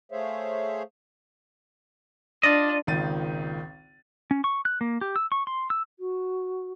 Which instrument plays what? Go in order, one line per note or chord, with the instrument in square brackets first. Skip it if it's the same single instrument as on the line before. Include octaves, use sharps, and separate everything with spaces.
[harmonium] A3 G#4 C5 C#5 E5 F5
[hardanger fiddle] D4 [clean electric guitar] F4 D5 D#5
[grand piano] G#1 C#2 A#2 D#3 A6 D#7
[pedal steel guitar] C#4
C#6
F#6
A#3
G4
E6
C#6
C6
E6
[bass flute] F#4